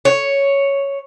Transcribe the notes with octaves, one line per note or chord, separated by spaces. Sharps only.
C#5